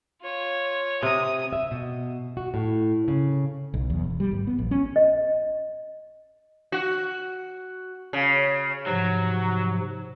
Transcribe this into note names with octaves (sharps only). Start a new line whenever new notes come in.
F4 C#5
C3 A#5 D#6
E5
B2
F#4
A2
C#3
B1
E2
E1
G3
G#1
B3
A#1
C#4
D#5
F#4
C#3
G#2 C3 F3 F#3